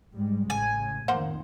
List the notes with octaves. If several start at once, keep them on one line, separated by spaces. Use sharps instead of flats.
G#2 G3 G#3
A1 C#3 G#5
F2 A2 D#3 A#3 C5 F#5